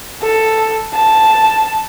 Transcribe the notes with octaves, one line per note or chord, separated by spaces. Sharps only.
A4
A5